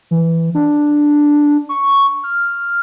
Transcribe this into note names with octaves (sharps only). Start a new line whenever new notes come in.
E3
D4
C#6
F6